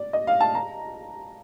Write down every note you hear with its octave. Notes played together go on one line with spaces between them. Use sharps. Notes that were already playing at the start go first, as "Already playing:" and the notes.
Already playing: D5
D#5
F5
A5
A#5